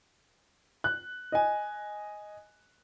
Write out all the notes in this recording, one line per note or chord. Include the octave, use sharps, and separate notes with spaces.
F#6
D#5 G#5